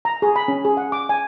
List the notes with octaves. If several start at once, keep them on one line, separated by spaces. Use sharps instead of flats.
A#5
G#4
B5
C#4
G#4
F#5
D6
G#5